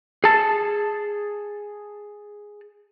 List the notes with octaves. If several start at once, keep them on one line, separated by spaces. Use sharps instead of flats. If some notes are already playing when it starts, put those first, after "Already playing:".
G#4 A5